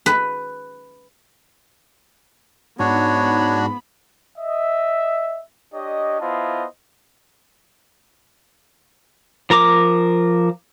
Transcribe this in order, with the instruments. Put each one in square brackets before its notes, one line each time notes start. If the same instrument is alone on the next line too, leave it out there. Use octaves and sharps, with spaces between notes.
[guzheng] B4
[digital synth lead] G#2 [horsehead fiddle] B3 B5 [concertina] D4 F#4 [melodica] C#5
[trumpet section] D#5 E5
D4 G4 C#5 D#5
B3 E4 F4 C5 D#5 A5
[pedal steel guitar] F3 A#4 A#5 D6